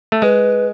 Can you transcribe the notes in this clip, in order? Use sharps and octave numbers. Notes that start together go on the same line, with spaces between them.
A3
G#3 B4